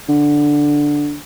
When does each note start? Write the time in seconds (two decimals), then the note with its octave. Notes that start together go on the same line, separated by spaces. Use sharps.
0.09 D3